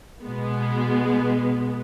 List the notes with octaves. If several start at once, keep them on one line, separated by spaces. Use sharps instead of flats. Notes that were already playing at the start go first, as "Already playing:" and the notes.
B2 G#3 B3